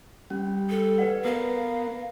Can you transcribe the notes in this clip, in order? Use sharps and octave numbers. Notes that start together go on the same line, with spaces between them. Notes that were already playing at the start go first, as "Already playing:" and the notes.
G3 C#4
A4
B4 D5 F#5
B3 A#4 B4 F5